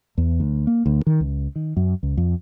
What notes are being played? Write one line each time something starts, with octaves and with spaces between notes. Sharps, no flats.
E2
D2
A#3
D2
D#3
C#2
D#3
F#2
C#2
F2